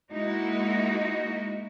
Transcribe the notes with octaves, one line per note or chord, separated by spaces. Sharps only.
G#3 A#3 D#4 E4 F#4